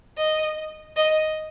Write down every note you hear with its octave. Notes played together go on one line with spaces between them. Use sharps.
D#5
D#5